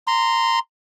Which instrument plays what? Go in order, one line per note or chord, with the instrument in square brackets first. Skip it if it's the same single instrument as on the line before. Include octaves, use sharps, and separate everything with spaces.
[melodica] A#5 C6